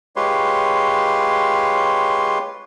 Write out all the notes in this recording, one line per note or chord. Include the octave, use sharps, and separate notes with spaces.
G#3 F4 G4 B4 C#5 C6